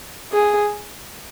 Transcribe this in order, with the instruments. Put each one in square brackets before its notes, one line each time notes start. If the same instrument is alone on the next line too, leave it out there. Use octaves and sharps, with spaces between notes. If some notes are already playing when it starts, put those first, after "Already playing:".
[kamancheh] G#4